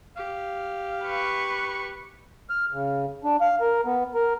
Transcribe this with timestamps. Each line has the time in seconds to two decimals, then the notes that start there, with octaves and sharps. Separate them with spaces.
0.17 G4 F5
1.05 B4 C#6
2.50 F6
2.72 C#3
3.24 D4
3.41 F5
3.61 A#4
3.85 B3
4.14 A#4